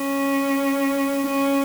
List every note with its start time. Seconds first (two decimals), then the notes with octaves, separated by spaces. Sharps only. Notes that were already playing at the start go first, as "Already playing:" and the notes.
Already playing: C#4
1.27 C#4